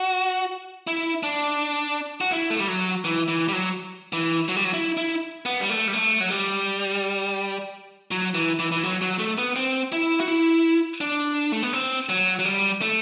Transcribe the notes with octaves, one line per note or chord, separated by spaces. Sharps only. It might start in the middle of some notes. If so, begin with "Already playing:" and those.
Already playing: F#4
E4
D4
F#4
E4
A3
G3
F#3
E3
E3
G3
F#3
E3
F#3
G3
F#3
E4
E4
B3
G3
A3
G3
A3
F#3
G3
F#3
E3
E3
E3
F#3
F#3
A3
B3
C4
E4
F#4
E4
D4
A3
B3
C4
F#3
F#3
G3
A3